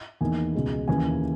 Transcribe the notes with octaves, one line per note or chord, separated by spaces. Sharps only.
E2 D#3 A#3 G#5
C#2 B2 G#3
D#2 C#3 E3 A#3 G#5